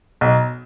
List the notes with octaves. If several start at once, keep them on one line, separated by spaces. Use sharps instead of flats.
B1